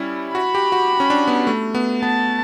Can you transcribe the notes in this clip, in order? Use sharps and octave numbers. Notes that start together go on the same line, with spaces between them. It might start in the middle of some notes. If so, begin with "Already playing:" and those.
Already playing: G3 C#4 E4
F#4 B5
G4
F#4
C#4
D4
B3
A3
B3
B3 A5